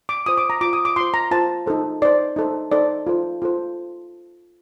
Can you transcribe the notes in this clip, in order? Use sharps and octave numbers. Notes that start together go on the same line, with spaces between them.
D6
F4 C5 D#6
D6
A#5
F4 C5 D6
D#6
D6
F4 C5 C6
A#5
F4 C5 A5
D#4 A4 C5
D#4 A4 C5 D5
D#4 A4 C5
D#4 A4 C5 D5
F4 A4 C5
F4 A4 C5